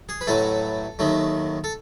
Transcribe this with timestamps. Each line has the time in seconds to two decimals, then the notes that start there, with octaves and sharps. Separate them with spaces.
0.09 G#4
0.21 B4
0.27 A1 A2 F#3 A3 A4
0.99 D#2 D#3 F#3 A3
1.64 A4